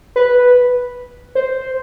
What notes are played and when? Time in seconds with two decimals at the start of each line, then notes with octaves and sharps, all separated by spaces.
0.16 B4
1.35 C5